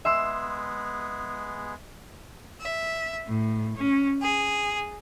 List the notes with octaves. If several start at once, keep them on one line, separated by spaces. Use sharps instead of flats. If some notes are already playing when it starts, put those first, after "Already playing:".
G#3 B3 G#4 E5 C6 E6
E5
A2
C#4
G#4